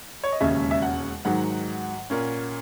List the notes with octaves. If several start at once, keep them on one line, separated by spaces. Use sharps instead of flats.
C#5
D#5
E1 D#2 C#3 G#3 C#4 E5
E5
F#5
G#2 D#3 F#3 F#5
A#2 A#3 C#4